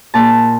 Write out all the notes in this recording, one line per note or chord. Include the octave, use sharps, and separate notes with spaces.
A#2 A5